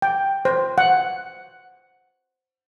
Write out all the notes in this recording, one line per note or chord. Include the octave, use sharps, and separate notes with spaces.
G5
C5
F#5